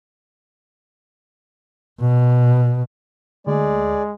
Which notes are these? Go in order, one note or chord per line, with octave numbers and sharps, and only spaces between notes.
B2
D2 G#3 G#4 D5